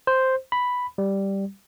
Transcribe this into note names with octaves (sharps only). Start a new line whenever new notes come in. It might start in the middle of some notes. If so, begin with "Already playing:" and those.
C5
B5
G3